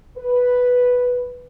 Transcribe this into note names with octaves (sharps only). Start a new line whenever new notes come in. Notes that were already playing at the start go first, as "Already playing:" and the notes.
B4